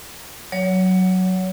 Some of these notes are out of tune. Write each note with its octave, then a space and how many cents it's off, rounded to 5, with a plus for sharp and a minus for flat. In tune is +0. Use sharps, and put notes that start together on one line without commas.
F#3 +0 C#5 +20